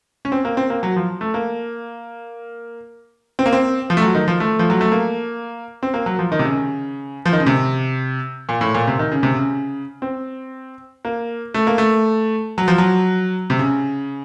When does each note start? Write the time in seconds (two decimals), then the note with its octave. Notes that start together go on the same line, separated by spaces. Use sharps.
0.25 C#4
0.32 C4
0.45 A#3
0.57 C4
0.70 A#3
0.83 F#3
0.96 F3
1.21 A3
1.34 A#3
3.39 C4
3.46 A#3
3.53 C4
3.90 F3
3.97 A3
4.02 F#3
4.15 D#3
4.28 F3
4.40 A3
4.59 F3
4.70 F#3
4.81 A3
4.92 A#3
5.83 C4
5.94 A#3
6.06 F#3
6.19 F3
6.32 D#3
6.39 C3
6.45 C#3
7.26 F3
7.33 D#3
7.40 C#3
7.46 C3
8.49 A#2
8.61 A2
8.74 A#2
8.87 C3
8.99 D#3
9.12 C#3
9.23 C3
9.35 C#3
10.02 C4
11.05 A#3
11.54 A3
11.67 A#3
11.78 A3
12.58 F#3
12.68 F3
12.78 F#3
13.50 C3
13.59 C#3